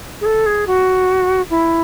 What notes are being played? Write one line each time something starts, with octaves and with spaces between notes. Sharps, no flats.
G#4
A4
G#4
F#4
E4